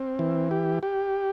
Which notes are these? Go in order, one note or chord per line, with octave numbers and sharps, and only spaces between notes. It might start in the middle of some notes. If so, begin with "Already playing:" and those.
Already playing: C4
E3
G4
G4